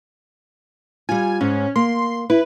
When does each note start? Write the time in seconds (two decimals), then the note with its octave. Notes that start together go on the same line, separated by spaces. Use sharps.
1.09 G3 F4 G#5
1.41 G#2 C#4
1.76 A#3 C6
2.30 E4 B4